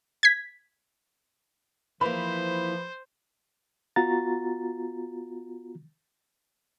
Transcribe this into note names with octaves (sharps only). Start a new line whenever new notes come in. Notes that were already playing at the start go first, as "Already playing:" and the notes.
G#6 B6
E3 F3 A#3 B4 C5 B5
B3 F4 F#4 A#5 A6